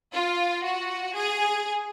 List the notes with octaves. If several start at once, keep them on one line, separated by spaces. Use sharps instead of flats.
F4
F#4
G#4